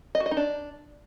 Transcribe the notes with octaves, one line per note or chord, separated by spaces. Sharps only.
D#5
F#4
D#5
D#4
D4